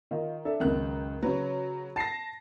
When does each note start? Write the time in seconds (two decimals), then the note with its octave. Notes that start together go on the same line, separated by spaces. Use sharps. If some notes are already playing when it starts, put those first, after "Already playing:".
0.11 D#3 F4 D#5
0.45 D4 A4 E5
0.60 C#2 F#2 D#3 F#6
1.23 C#3 F#3 B4 C#5
1.96 A5 A6 A#6 C7